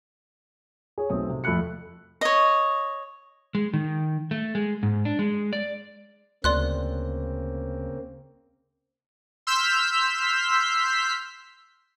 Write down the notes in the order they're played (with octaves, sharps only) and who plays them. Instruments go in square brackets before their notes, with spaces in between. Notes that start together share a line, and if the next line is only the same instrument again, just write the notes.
[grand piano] G#4 C#5
B1 A3 C4 D#6
C3
F2 A3 B5 F#6 C#7
[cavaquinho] C#5 D#5
[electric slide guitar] G#3
D#3
A3
G#3
G#2
D4
G#3
D5
[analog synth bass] D2 [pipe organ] C#3 A#3 C4 [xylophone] D5 C6 F#6
[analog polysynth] C6 E6 F6 G6 B6